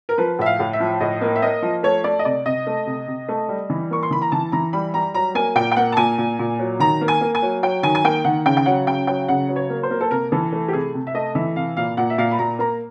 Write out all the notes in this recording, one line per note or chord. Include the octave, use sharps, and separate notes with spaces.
A#4
F3 B4
A2 E5
F5
A2
E5
F3
A2 D#5
A#3
E5
A#3 D#5
F3
A3 C#5
A3 D5
D#5
C3 D5
C3 D#5
A3
C3
C3
A3
G3
E3
A#3 C#6
C6
E3 B5
A#5
E3 A5
E3 A#5
G3 B5
G3 A#5
F#3 A#5
A#3 G#5
A#2 G5
G5
A#3 F#5
A5
A#2 G#5
A#2
A#2
F#3
D#3 A#5
A#3
G#5
A#3
G#5
F#3
F#3 G5
D#3 G#5
G#5
A#3 G5
D#3 F#5
C#3 G5
G5
F#3 F#5
C#3 G5
F#3 G5
C#3 F#5
F#3
C#5
A#3
C5
A#3
A4
C3 A#4
E3 A4
A3
G4
C3 G#4
C3
E5
A3 D#5
E3 E5
C3 F5
A#2 F5
A#2 F#5
E5
A#2 F5
B5
A#2 A#5
A#3 A#5